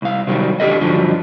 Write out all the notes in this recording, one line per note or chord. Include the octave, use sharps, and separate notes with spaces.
C2 F5
C3 D#3 F#3 G3
D#2 D4 G4 A4 B4 D#5
G2 D3 F3 F#3